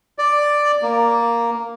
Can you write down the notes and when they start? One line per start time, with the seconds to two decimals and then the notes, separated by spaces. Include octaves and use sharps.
0.19 D5
0.82 A#3